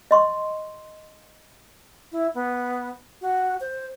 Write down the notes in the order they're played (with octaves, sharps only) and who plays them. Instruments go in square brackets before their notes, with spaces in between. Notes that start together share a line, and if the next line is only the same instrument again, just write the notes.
[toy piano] D#5 C6 C#6
[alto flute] E4
B3
F#4
C5